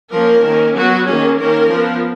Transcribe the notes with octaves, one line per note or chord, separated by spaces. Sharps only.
F3 A#3 C#4 A#4
D#3 A#3 C#4
F#3 B3 F#4
D#3 A#3 C#4 G#4
D#3 A#3 C#4 A#4
F3 B3